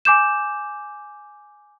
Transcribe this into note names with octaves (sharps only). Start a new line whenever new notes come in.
G#5 D6 G6 E7